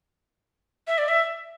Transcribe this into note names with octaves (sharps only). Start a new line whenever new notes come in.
E5
D5
E5